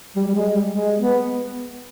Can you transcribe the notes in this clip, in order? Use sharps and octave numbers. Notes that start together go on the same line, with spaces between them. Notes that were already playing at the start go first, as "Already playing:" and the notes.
G3
G3
G#3
G3
G#3
B3